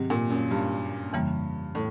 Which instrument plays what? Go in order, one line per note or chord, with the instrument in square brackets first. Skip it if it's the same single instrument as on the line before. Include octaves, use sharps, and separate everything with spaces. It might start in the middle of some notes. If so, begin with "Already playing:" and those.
Already playing: [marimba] G#2 D#3 F#3 [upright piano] C3
[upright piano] A#2
F#2
G2
[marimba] F2 C#3 E3 G3 A#3
[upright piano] A2